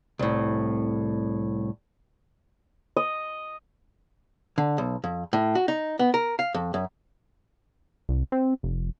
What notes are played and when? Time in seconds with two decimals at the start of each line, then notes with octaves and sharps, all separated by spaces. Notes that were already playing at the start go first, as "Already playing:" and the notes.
0.19 C2 A2
2.97 D#5
4.58 D3
4.78 B1
5.04 F2
5.33 A2
5.55 F#4
5.68 D#4
5.99 B3
6.14 A#4
6.39 F5
6.54 F2
6.74 F#2
8.09 C2
8.32 C4
8.63 F1